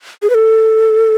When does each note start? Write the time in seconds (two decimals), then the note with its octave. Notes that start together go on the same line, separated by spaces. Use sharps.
0.22 G#4
0.30 B4
0.34 A4